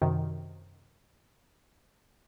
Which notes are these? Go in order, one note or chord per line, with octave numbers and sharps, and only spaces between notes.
F#2 C3 D#3